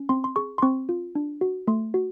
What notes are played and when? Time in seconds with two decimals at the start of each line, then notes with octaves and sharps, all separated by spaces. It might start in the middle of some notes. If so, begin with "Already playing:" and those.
Already playing: C#4
0.09 C4 C6
0.24 C6
0.36 G#4 C#6
0.58 C6
0.62 C4 C#6
0.89 F4
1.15 D4
1.41 F#4
1.68 A3 C6
1.94 F#4